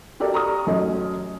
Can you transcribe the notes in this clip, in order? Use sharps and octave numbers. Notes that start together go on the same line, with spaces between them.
F#4 G4 A4 A#4 D5
A#5 C#6 D#6 F6
F#2 A3 C#4 F#4 D#5